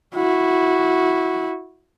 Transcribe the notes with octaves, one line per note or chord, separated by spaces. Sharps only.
E4 F#4